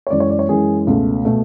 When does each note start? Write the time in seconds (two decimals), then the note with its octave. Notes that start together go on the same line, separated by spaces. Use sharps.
0.07 C#5
0.10 F#2 E3 G#3 D5
0.20 C#5
0.30 D5
0.39 C#5
0.48 F#2 E3 G#3 G#4
0.87 C#2 B2 A3
1.25 B2 A3